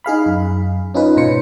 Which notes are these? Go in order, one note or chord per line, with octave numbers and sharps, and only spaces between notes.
D#4 G#4 F5 B5
F#2
C#4 D#4 F4 B4
G#2 B2 C#4 C5 C#7